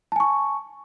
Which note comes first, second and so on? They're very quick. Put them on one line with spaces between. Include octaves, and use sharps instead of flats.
A5 G#5 C#6